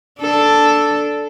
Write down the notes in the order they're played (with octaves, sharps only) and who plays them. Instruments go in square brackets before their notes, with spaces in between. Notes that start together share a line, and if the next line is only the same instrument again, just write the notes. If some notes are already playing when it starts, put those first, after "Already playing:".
[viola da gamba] D4 A4